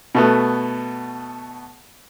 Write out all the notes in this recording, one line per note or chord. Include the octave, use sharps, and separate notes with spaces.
B2 A3 B3